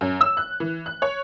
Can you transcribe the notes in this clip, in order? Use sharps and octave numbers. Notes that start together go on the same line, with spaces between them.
F#2
E6
F#6
E3
F#6
C#5